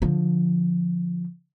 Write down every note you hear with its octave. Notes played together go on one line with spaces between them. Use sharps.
D3 F3